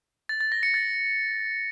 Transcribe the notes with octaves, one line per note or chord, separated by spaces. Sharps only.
A6
A6
A#6
C#7
A6